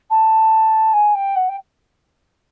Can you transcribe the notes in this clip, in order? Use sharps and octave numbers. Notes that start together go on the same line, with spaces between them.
A5
G#5
G5
F#5
G5